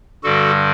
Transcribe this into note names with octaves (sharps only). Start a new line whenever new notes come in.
G2 D3 G3 F#4 A4